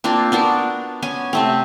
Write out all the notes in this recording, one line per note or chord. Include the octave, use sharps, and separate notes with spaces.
A#3 C4 D4 F4
B3 D4 F#4 A#4
B3 C#4 G#5
C3 A3 C4